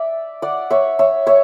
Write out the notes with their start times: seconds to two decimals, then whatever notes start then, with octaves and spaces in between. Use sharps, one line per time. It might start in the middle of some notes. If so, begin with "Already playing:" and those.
Already playing: D5 E5
0.42 D5 F#5
0.70 C#5 E5
0.99 C#5 E5
1.27 C#5 E5